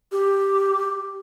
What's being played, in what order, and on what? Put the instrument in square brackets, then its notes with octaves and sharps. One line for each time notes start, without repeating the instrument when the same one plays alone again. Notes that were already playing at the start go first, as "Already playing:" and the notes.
[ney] G4